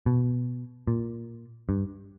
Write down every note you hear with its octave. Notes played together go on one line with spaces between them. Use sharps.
B2
A#2
G2